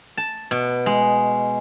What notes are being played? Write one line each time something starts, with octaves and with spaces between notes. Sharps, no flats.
A5
B2
G#3